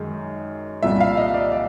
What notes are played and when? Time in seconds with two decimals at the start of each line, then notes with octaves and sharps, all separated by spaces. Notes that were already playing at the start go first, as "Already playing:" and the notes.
Already playing: F#2 D#3 G#3
0.83 C2 A#2 G3 E5
1.00 F5
1.17 D#5
1.34 D5
1.52 D5